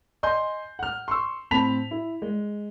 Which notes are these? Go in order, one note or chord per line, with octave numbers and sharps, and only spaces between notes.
D#5 G#5 C6 G6
F#5 F6
C6 C#6 E6
A2 C4 A5 B5 B6 F7
E4
G#3